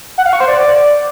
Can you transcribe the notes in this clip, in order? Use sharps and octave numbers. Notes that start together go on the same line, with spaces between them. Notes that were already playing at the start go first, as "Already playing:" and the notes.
F#5
F5
C#6
C5
D5